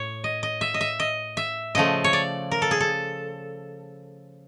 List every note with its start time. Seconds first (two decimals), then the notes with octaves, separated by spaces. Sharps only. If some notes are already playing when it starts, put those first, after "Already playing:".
Already playing: A2 C#5
0.24 D#5
0.43 D#5
0.61 E5
0.74 D#5
0.81 E5
1.00 D#5
1.37 E5
1.75 C#3 F3 A3 D#5
2.04 C#5
2.13 D5
2.51 A#4
2.62 A4
2.71 G#4
2.80 A4